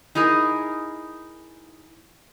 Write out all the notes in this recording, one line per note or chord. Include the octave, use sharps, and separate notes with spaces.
D#4 E4 G#4 A#4